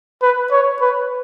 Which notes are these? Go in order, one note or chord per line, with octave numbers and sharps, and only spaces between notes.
B4
C#5
B4